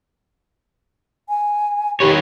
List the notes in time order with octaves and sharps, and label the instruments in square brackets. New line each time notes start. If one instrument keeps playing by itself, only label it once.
[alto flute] G#5
[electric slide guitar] D#3 B4 C#5 [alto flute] G4